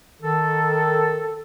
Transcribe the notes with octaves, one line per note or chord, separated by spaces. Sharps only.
D#3 A4